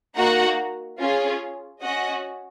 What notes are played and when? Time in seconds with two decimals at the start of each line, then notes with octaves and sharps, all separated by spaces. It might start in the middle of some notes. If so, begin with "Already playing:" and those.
0.17 A#3 D#4 F#4 F#5 A#5
0.99 C#4 F4 G#4
1.82 C#4 F#4 D#5 F#5